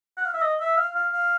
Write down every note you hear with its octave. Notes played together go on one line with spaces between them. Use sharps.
F#5
F5
E5
D#5
E5
F5
F5
F5